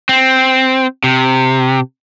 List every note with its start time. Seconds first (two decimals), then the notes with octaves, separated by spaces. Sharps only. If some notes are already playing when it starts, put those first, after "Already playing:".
0.09 C4
1.04 C3